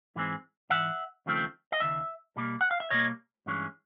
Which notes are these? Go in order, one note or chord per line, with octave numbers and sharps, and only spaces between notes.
G#2 E3 G#3 C4
G#2 E3 E5 F#5
D#2 C#3 F3 A3 C4
D#5
D#2 C#3 E5
B2 G3 A#3
F#5
F5
E5
B2 G3 A#3 C#5 D#5
G2 E3 G#3 C#4